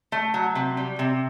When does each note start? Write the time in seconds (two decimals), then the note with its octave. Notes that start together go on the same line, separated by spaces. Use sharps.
0.12 A3
0.34 F#3
0.55 C3
0.77 G3
0.99 C3